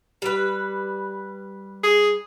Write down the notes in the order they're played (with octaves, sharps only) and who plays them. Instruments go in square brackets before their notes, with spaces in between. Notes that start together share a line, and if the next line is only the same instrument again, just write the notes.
[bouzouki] G3 B4
[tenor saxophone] G#4